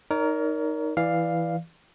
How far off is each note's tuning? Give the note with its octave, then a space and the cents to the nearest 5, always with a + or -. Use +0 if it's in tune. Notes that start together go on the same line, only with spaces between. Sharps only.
D#4 +0 A#4 +5 C#5 +40
E3 +0 D5 +10 F5 +0